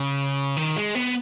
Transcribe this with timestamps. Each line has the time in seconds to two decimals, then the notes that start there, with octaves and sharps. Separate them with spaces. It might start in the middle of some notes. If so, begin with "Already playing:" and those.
Already playing: C#3
0.57 D#3
0.77 G#3
0.95 B3